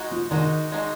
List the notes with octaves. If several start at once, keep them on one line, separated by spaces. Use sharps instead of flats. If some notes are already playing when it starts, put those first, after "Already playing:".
Already playing: G#3 D#4 F#4
F3
D#3 G#3 D#4 F#4
G#3 D#4 F#4